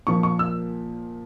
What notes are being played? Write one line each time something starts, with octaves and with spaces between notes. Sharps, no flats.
A#2 F3 C#6
C#6
E6